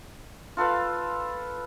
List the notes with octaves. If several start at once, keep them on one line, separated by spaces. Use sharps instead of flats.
F4 A4 B4 F5